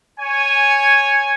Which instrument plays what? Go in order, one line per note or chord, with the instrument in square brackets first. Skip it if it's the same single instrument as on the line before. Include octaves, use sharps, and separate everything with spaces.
[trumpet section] C#5 G#5